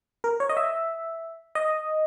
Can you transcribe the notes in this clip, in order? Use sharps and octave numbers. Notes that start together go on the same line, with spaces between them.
A#4
C#5
D#5
E5
D#5